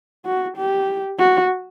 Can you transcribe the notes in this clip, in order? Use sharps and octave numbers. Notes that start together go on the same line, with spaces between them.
F#4
G4
F#4